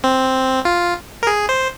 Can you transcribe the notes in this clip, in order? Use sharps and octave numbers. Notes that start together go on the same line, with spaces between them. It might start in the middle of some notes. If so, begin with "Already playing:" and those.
C4
F4
A#4
G#4
C5